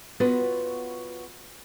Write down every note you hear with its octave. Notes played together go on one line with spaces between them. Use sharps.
B3 F4 F#4 B4 C#5